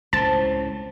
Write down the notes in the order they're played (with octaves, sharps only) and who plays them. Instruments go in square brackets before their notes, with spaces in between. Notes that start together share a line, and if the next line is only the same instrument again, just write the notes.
[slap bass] C#2 A2 [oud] C4 [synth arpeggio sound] A5